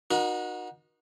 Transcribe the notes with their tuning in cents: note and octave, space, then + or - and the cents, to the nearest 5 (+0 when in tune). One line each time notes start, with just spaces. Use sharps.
D#4 -20 F#4 -20 A#4 +35